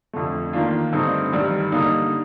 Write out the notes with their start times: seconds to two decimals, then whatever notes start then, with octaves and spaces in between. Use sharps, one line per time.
0.13 F2 D3 A3
0.53 D#3 A#3 D4 F4
0.93 G2 D3 A3 C4 D#4
1.33 G2 D#3 G3
1.72 D3 G3 A#3 D#4